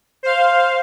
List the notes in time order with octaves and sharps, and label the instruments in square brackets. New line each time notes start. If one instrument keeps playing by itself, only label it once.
[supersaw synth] C5 F5